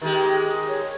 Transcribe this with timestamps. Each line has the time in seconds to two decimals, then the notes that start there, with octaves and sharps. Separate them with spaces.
0.02 D#3 G#3 G4
0.69 C#5